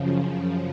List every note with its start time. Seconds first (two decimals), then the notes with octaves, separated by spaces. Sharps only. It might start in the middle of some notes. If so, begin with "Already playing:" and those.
Already playing: F#2 C#3 F3